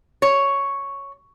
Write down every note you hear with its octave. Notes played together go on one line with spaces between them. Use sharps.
C#5